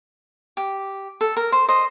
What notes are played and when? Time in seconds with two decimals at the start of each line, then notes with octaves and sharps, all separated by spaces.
0.57 G4
1.21 A4
1.37 A#4
1.52 C5
1.68 C5 D#5